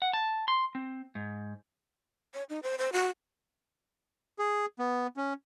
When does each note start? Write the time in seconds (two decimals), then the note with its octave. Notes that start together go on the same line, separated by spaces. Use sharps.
0.02 F#5
0.13 A5
0.48 C6
0.75 C4
1.15 G#2
2.34 C#5
2.49 D#4
2.63 C5
2.78 C5
2.93 F#4
4.39 G#4
4.79 B3
5.17 C#4